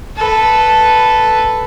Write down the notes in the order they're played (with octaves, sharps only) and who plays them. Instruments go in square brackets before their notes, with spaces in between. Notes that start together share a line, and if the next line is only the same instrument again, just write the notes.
[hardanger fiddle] A4 B4